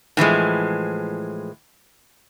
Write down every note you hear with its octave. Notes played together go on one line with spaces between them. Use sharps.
A2 E3 F3 G#3